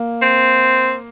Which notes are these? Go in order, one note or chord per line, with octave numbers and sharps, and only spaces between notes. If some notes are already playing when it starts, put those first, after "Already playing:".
Already playing: A#3
C4